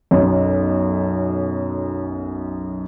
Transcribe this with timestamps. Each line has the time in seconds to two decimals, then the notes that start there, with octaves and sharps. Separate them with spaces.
0.11 B1 F#2